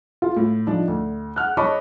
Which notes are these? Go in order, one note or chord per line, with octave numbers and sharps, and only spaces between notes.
F4
A2
F3 D4 D#4
D2
F#5 F6 F#6
C#5 D#5 A5 B5 C#6 D6